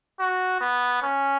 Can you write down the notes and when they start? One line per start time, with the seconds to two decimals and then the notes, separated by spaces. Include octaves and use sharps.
0.19 F#4
0.61 B3
1.02 C#4